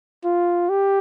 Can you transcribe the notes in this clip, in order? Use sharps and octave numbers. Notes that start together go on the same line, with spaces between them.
F4
G4